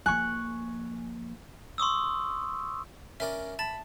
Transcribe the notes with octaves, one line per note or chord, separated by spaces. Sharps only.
F3 A#3 G#5 C#6 F#6
C6 C#6 D#6 E6
C#4 A#4 D5 E5
A5 B5 A6